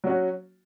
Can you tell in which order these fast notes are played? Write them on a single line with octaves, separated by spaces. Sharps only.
F#3 C#4 F#4